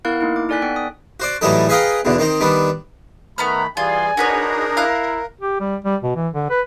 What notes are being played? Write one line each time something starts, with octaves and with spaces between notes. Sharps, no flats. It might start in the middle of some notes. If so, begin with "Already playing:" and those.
B3 E4 A#4 F5 F#6
A#3 D#4 E4
D6
D#4 A4 D5 G#5 F#6 B6
B3 G5
D#6
F#4 C5 D5
A2 E3 F#3 G3 D#4 A4
G#4 B4 D#5 F5 G5 A#5
B1 E2 B2 D3
D#3 C4 D#4
D#3 G3 B3 D4
D#3 A3 B3 A#5 B5 F6
E3 G3 F4 G#4 D5 G#5
D4 D#4 F#4 G#4 A#4 B4 C#5
E4 F5 A#5 F#6
G4
G3
G3
B2
E3
D3
B4